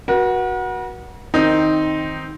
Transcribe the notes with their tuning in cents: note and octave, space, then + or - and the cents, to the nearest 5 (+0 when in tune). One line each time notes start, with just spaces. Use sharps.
F#4 +0 B4 -45
D#3 +0 C4 +0 D#4 +5